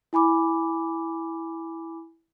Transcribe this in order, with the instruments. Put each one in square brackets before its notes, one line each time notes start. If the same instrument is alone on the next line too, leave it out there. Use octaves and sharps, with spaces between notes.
[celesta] E4 G#5 B5 D6